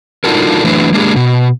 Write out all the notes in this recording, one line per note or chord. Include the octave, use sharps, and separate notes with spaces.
D4 D#4 F4 F#4 A4 A#4
E3 F#3 A3 D4 B4
G#3 A#3 D4 G4 G#4
B2